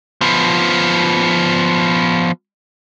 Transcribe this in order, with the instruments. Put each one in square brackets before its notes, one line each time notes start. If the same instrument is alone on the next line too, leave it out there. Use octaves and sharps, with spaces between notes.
[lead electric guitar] F3 B3